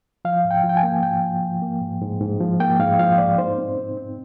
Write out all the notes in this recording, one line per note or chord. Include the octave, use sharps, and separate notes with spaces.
F3 F5
G#2
G5
F3
G5
G#5
A#3
G#2 G5
F3
F3
A#3
G#2
G#2
G#2
F3
A#3 G5
G#2 F5
F3 F5
G#2 D5
D#4 C5
C4
C4
C4